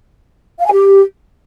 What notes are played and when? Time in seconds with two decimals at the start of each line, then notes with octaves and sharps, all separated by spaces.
0.59 F5
0.65 G#5
0.72 G4